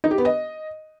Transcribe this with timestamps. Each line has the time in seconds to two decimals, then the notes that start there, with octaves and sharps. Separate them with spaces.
0.04 D#4
0.11 G4
0.18 B3
0.25 D#5